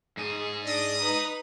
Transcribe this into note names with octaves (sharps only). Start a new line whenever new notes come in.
G#2 G#4
D4 D#5 D#6
D#4 B4